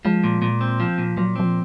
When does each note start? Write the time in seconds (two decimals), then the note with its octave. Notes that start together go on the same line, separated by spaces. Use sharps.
0.05 F3 G#3
0.24 A#2
0.42 A#2
0.61 C4
0.80 F3
0.98 A#2
1.17 A#2 F#3
1.36 F#3 C4
1.45 F3